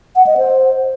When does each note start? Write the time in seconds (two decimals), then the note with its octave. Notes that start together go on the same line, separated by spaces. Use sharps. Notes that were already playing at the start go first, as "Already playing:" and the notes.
0.16 F#5
0.27 D#5
0.37 C5